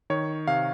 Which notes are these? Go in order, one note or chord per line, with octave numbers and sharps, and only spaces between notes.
D#3 C#5
C3 F5